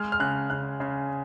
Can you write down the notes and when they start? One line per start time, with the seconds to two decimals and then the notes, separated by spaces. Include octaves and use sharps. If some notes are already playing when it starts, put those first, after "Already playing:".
Already playing: G#3 F6
0.12 F6
0.20 C#3 F#6
0.50 C#3 F#6
0.80 C#3